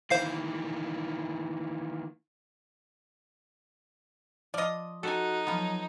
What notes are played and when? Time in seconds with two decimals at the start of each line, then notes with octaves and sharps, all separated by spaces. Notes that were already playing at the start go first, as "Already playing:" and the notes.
0.10 D#3 E3 A#3 C5 F5 C7
4.54 F3 F4 D5 D#5
5.03 D#4 F#4 A4 G#5
5.47 F3 F#3 B3